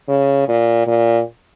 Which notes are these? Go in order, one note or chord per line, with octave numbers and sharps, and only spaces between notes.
C#3
A#2
A#2